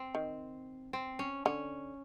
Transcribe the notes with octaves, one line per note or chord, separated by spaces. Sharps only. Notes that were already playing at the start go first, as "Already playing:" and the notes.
Already playing: C4
D#3
C4
C#4
D3 C#4